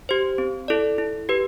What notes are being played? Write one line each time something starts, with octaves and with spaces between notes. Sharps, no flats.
G4 C5
C4
E4 A4 D5
E4
G4 B4